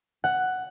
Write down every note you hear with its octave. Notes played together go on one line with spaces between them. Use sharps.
F#5